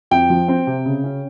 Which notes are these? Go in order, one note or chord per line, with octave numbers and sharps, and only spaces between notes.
F2 G5
F3
C4
C3
C#3
C#4